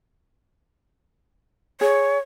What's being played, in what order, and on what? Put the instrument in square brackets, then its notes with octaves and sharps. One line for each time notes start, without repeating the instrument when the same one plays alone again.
[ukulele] G#4 [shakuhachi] C#5